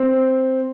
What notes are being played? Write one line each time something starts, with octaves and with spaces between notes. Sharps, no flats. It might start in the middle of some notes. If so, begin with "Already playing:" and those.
Already playing: C4